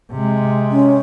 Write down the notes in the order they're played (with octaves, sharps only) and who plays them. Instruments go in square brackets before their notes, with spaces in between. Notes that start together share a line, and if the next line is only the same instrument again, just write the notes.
[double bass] C3 G#3
[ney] C#4